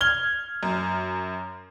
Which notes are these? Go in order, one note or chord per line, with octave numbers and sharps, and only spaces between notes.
F6 G#6 G7
F#2